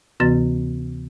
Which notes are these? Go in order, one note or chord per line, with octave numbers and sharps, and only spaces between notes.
D2 C3 E3 B3 F#4 A6